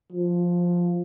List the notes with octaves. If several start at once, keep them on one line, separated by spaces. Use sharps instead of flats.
F3